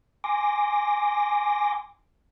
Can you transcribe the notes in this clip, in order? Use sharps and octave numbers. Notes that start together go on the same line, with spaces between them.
G#5 C6 D6 A#6